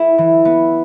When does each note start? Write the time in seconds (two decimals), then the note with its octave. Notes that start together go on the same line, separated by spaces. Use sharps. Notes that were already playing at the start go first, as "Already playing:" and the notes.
Already playing: E4 A4
0.18 E3
0.45 B3